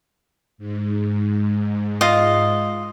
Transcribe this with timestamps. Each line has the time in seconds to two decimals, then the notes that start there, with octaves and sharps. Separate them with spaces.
0.58 G#2
2.01 F4 D#5